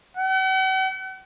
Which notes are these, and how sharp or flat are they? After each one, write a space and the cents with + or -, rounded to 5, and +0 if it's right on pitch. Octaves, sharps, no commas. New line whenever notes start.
F#5 +45